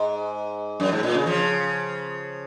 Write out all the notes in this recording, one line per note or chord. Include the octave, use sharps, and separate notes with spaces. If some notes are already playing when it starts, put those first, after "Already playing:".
Already playing: G#2
F#2
G#2
A#2
C#3
C#3 F3